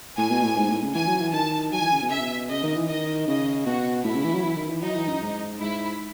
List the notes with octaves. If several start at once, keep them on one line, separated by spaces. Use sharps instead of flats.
A2 G#5
B2
A2
G#2
A2
C#3
E3 G#5
F#3
E3
D#3 A5
F#3 G#5
E3
C#3
B2
C#3 E5
B2
C#3 D#5
D#3
E3
D#3 D#5
C#3 D#5
B2 F#4
A2 E4
C#3
E3
F#3
E3
D#3
E3
F#3 D#4
E3
F#2
G#2
G#2 E4